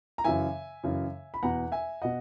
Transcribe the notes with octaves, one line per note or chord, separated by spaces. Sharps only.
A#5
F#2 C#3 E3 E5 G#5
F#2 C#3 E3
B5
E2 B2 F#5 A#5
E5 G#5
B2 D#5 F#5